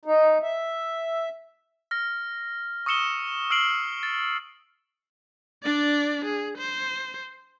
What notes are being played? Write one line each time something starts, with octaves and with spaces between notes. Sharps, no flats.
D#4
E5
F6 A#6
C#6 D#6 E6 C#7 E7 G7
E6 F6 C7 D7 F#7
A6
D4 D5
G#4
C5